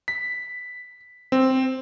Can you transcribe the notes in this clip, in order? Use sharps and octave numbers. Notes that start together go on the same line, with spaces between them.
B6
C4